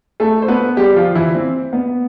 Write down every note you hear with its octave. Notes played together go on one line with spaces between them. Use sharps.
A3 A4
C5
B3 B4
G3 G4
F3 F4
E3 E4
C4
B3